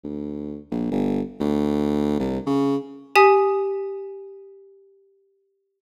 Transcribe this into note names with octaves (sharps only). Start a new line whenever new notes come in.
D2
A#1
G1
D2
C2
C#3
G4 G#5 D#6 B6